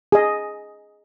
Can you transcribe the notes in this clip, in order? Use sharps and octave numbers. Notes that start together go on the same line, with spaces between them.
G#4 D#5